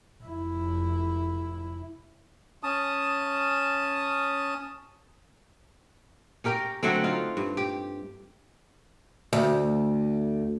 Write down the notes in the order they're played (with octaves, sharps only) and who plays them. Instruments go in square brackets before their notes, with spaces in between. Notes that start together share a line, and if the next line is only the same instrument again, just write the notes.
[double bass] F1 E4
[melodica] C#4 A5 D#6
[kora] C#4 G4 A#4 G5
D3 F#3 A3 C4
D#4 F4
G2
G4
[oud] D2